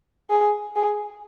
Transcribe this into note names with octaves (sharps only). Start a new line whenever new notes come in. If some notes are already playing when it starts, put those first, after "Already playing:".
G#4
G#4